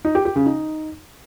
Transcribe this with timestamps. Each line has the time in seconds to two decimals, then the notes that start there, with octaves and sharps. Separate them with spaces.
0.05 D#4
0.15 G4
0.25 G4
0.36 C#3
0.46 D#4